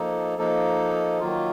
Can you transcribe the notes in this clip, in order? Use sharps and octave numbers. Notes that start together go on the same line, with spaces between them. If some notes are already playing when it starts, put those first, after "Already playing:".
Already playing: F3 A#3 D#4 A4
F3 A#3 D#4 A4
D#3 F#3 A#3 F4